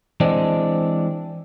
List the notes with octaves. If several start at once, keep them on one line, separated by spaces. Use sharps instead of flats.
E3 G#3 C4 D4